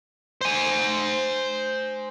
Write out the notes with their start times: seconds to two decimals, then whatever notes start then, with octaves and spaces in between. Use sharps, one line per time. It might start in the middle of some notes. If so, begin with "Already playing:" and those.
0.41 C5 G#5